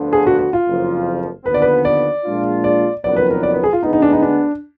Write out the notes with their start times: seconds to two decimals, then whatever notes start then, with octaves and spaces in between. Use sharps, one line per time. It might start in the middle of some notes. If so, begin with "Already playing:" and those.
Already playing: D2 D3 F3 B3
0.13 G#4
0.27 F#4
0.39 F#4
0.53 F4
0.66 F#1 F2 F3
1.45 D#2 D3 F3 B3 B4
1.54 D5
1.62 B4
1.85 D5
2.24 A#1 A#2 G#3 D4 F4
2.64 D5
3.04 F#1 F2 D#3 F#3 B3 D5
3.16 B4
3.30 A#4
3.43 D5
3.54 B4
3.64 G#4
3.73 F4
3.83 D2 D3 G#3 B3 D#4
3.93 D#4
4.02 D4
4.13 D#4
4.22 D4